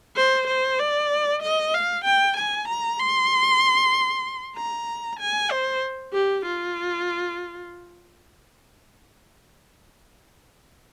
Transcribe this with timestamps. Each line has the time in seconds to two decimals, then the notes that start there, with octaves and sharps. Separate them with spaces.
0.16 C5
0.47 C5
0.79 D5
1.43 D#5
1.74 F5
2.05 G5
2.37 G#5
2.68 A#5
2.99 C6
4.56 A#5
5.20 G#5
5.51 C5
6.13 G4
6.45 F4